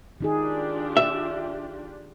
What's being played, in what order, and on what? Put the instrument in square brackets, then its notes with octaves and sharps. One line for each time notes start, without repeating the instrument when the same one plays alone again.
[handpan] D#3 D#4 G#4 [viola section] D4 F4 G4
[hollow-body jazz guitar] E5